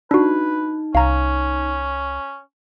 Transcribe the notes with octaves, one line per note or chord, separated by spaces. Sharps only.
D4 D#4 F#4 B4
C2 C#4 F5 A#5